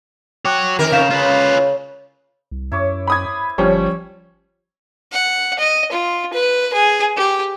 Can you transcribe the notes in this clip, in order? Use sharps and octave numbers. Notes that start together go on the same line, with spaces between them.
F#4 C#5 G5 D6 F#6
F2 D#3 A#4
C#3 F5 G6 E7
C#3 F4 B4
C2
F#2 E4 C#5 D6
C5 B5 D#6 G#6
G1 F3 G3 C#4 C#5
F#5
D#5
F4
B4
G#4
G4